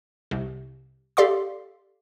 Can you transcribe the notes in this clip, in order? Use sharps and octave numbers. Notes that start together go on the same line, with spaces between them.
C2 C3
G4 A4 D5 F5 C6 D6